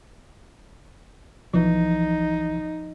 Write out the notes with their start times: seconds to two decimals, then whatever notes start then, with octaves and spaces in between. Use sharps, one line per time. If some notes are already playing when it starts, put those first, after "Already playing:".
1.54 B1 E3 F3 D#4